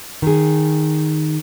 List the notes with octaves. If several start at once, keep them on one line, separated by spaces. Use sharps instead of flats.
D#3 G#4